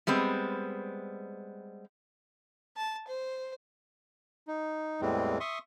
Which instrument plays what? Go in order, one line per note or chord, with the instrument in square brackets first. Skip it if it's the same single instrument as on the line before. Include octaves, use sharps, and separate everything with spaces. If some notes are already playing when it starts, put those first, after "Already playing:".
[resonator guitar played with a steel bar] G3 G#3 B3 C4
[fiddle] A5
C5
[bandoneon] D#4
E2 A2 E3 G3 G#3 C4
E5 C6 C#6 D#6